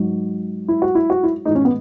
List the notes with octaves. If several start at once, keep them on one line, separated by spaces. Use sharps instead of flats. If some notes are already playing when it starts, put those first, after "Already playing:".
Already playing: G#2 F#3
E4
F#4
E4
F#4
E4
A2 E3 G#3 D#4
C#4
B3